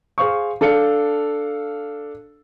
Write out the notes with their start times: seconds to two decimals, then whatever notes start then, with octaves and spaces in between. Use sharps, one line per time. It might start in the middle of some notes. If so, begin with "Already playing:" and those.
0.18 G#4 C5 F5 C#6
0.61 D4 A4 F5 C#7